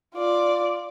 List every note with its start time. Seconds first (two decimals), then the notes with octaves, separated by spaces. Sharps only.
0.15 F4 D5